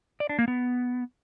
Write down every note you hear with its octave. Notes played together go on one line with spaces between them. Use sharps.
D5
D4
A#3
B3